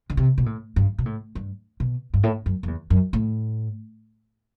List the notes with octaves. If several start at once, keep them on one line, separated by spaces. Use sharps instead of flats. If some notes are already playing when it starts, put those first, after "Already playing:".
D3
C3
B2
A2
G2
B2
A2
G2
B2
G2
A2
F#2
F#2
E2
F#2
A2